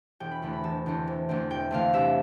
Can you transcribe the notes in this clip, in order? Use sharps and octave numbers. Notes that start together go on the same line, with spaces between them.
E1 G5
B5
E2 D3 A3 C4 B5
B5
E1 A5
E2 D3 A3 C4
E1
E2 D3 A3 C4
E1 G5
E2 D3 A3 C4 F5
C2 E5